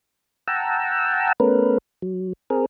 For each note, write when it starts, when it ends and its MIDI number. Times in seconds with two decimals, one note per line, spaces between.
0.48 1.33 78
0.48 1.33 79
0.48 1.33 81
0.48 1.33 82
0.48 1.33 88
1.40 1.78 57
1.40 1.78 59
1.40 1.78 61
1.40 1.78 70
1.40 1.78 71
2.02 2.33 54
2.50 2.66 60
2.50 2.66 68
2.50 2.66 70